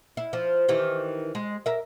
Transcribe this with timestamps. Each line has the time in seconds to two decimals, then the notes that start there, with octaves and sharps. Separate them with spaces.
0.17 E4
0.33 F3
0.68 D#3 E3 G4
1.35 G#3
1.66 A#4 E5